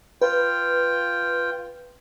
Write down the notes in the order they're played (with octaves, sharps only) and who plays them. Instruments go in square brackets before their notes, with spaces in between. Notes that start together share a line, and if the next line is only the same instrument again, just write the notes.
[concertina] F4 G5 [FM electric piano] B4